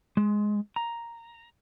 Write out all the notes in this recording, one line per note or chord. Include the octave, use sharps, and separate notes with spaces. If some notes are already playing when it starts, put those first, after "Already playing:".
G#3
A#5